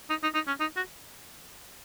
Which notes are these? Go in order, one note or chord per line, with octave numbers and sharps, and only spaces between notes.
D#4
D#4
D#4
C#4
D#4
F#4